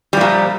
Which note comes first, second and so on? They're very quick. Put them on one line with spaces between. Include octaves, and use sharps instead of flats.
G3 F3 A#2